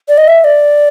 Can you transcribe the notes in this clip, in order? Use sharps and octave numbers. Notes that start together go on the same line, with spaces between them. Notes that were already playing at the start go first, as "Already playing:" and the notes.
D5
D#5
E5
D5